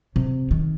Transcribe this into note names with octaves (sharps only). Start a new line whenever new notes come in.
C3
D#3